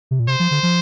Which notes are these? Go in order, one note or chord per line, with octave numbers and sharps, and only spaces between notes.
C3
A#2
C3 C5
F3
D3
F3